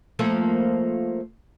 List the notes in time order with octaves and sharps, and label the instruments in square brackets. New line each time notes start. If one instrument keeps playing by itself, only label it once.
[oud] F3 A3 A#3